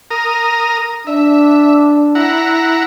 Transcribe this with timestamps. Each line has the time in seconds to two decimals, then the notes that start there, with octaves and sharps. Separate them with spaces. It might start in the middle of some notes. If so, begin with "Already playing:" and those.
0.11 A#4 A#5 D#6
1.07 D4 E5
2.15 E4 F#5 A#5